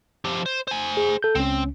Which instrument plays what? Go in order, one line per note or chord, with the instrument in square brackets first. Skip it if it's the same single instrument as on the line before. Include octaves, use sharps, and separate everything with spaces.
[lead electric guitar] F3 G4
C5
C5 G#5
[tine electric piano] G#4
A4 G6
[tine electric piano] C#2 C#4 [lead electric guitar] C4